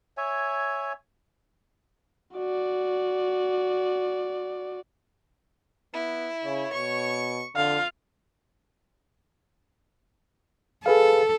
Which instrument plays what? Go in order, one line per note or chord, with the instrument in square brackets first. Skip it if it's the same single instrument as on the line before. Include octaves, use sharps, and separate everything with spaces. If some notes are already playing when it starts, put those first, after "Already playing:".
[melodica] C#5 E5 G#5
[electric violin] F#4 D5
[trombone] B3 [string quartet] E4
[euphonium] C#3 [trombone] C#5
[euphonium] B2 [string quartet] C#6
[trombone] F2 [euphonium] D3 [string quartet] F4 [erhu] F5
[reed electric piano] G#4 B4 F5 [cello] A4